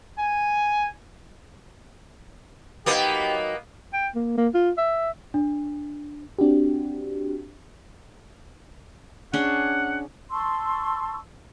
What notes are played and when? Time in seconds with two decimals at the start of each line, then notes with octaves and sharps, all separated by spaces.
0.18 G#5
2.86 F#3 A#3 B3 D#4 G4 G5
3.93 G5
4.15 A#3
4.37 A#3
4.55 F4
4.78 E5
5.34 D4
6.39 C4 D4 F#4 G4
9.33 C#4 D4 G#4 F#5
10.31 A5 C6 C#6 E6